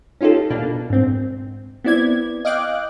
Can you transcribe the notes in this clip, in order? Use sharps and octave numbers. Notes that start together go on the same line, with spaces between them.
C#4 D#4 F4 G4 A4
B2 A#3 D4
G#2 C4
B3 C4 E4 D5 G#6
D#5 F5 G5 D6 F#6